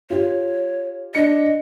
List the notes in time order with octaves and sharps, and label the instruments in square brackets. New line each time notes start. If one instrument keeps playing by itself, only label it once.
[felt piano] F4 G4 [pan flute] C#5
[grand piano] D4 C#7 [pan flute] D#5